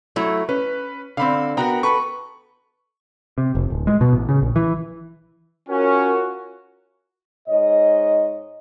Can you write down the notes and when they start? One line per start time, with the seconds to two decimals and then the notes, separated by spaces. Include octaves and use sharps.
0.16 F#3 A3 E4
0.49 C#4 B4
1.17 D3 C4 F5 B5
1.57 B3 F#4 A#4 G5 A#5
1.83 A4 B4 C#6
3.38 C3
3.55 F1
3.70 D1
3.87 G#3
4.01 B2
4.13 A1
4.29 C#3
4.42 A#1
4.56 E3
5.69 C#4 F4 F#4 A#4
7.49 G#2 C#5 D#5